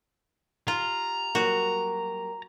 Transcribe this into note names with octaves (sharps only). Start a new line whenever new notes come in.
F4 G4 A#5
F#3 G3 A#3 F#4